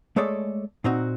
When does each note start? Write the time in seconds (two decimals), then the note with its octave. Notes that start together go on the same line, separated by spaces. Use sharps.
0.16 G#3 A3 G#4 A4 C#5 D5
0.84 A#2 C4 D#4 F#4